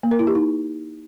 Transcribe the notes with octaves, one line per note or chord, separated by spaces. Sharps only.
A#3
A#4
E4
G4
D#4